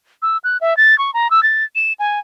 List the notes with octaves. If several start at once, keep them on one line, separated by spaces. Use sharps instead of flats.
E6
F#6
E5
A6
C#6
A#5
E6
A6
E7
G#5